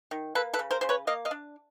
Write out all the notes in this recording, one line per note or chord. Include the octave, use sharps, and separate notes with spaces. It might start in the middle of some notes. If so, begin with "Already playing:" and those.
D#3
A#3 A4 B4
A4 B4
C#3
A#4 C5
C#3 C5
B4 C#5
A#3 D#5 F5
D#5 F5
D4